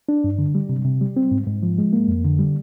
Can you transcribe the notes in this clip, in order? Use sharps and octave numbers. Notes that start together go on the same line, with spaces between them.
D4
G2
D3
G3
C3
C3
G3
C4
G#2
G#2
F3
G#3
A#3
F2
D3
G3